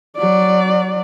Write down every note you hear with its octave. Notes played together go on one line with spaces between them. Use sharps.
F#3 D5